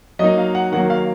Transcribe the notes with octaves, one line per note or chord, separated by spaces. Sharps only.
F#3 A#3 D#4 D#5
F5
F#5
D#3 F#3 A#3 F#5
F5